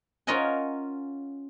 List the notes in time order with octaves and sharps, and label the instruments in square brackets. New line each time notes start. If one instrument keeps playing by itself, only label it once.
[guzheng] C#4 F4 A#4 D#5 F#5 G#5